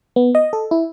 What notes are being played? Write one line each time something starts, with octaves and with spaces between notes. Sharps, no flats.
B3
D#5
A4
E4